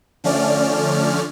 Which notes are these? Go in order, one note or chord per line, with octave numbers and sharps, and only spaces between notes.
D3 F3 A3 C#4 D5 F6